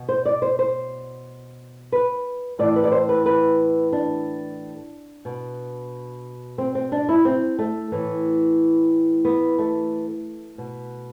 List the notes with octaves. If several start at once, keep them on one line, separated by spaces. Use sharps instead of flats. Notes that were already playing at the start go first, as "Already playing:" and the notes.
Already playing: B2
C5
D5
C5
C5
B4
A2 E3 D5
B4
D5
C5
B4
B4
D4
B2
C4
C4
D4
E4
C4
A3
A2 E3
B3
A3
B2